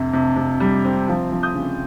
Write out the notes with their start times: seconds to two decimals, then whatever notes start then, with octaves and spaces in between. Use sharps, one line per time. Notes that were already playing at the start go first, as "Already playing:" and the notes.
Already playing: F2 C3
0.13 C3
0.36 C3
0.60 G3
0.85 C4
1.08 F3
1.31 F3
1.43 D#6 G6
1.55 C#3